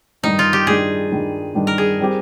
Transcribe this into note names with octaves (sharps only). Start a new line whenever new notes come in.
G2 D#3 G3 D4 D#4
F4
G4
G2 D#3 G3 D4 G#4
G2 D#3 G3 D4
G2 D#3 G3 D4
A#4
G#4
G3 C4 G4